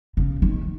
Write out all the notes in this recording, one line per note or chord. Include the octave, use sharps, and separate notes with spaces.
C#3
D#3